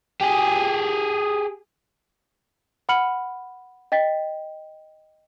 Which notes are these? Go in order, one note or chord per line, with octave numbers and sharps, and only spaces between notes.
G4 G#4
F#5 B5 F6 C#7 F#7
D#5 G5 A6 B6